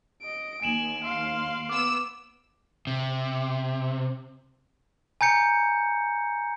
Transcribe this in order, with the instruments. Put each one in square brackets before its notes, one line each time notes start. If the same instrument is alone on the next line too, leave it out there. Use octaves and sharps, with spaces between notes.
[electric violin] D#5 D7
[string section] D#2 [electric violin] G#5 [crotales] D7 E7 F#7
[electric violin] F5 C6
[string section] B3 E6 [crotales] D6
[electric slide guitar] C3
[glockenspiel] G#5 A#5 G6 C#7